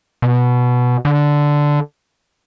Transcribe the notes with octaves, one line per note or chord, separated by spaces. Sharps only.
B2
D3